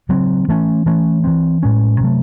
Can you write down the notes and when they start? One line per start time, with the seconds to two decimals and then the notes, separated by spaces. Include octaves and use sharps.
0.09 C#3 F#3 C4
0.48 E3 A3 C#4
0.86 E3 A3 C#4
1.24 E3 C4
1.62 A2 G#3 C#4
2.01 C3 F#3 A3